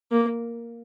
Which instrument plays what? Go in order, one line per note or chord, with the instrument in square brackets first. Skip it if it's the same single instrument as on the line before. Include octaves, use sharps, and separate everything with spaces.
[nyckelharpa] A#3